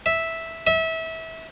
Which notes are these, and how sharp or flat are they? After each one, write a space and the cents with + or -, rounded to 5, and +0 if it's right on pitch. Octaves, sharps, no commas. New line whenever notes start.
E5 -5
E5 -25